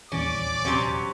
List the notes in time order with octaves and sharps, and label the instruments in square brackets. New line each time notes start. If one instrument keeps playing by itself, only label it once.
[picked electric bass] D#1 A#1 E2 [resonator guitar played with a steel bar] C#4 [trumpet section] D5 D6
[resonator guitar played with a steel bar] C3 F#3 C#4